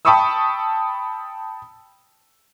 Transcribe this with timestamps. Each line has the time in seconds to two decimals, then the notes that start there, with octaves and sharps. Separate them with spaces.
0.05 G5 A5 B5 C#6 D#6 E6